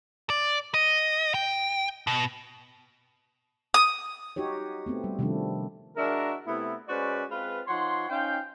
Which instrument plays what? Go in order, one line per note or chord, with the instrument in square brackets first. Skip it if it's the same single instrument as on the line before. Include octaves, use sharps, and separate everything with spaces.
[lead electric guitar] D5
D#5
G5
B2
[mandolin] D#6
[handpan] D#4 F#4 G4 C#5
A3 B3 C4
G3
C3 D#3 F3 G3 A3 D4
[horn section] G#3 D4 E4 F#4 A#4
C3 A3 B3 E4
G#3 C#4 F#4 B4 C5 D5
G#3 C4 F4 B4
F3 D#4 C#5 F#5 C6
C#4 D#4 C5 F5 G5